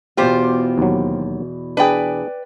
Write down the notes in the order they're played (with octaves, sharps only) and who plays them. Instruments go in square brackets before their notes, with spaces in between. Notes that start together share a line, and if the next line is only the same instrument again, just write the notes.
[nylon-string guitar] E2 B2 [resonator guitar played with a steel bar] F4 G4 C5
[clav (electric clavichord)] D#2 F#3
[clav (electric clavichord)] D4 G#4 [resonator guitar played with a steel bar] B4 D5 G5